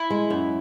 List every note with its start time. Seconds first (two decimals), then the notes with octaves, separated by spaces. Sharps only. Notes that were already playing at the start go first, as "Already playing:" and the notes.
Already playing: E4
0.10 G#3
0.30 F#2